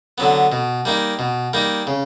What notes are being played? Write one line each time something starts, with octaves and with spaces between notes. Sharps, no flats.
D3 F#3 B3
B2
G3 A#3 D#4
B2
G3 A#3 D#4
C#3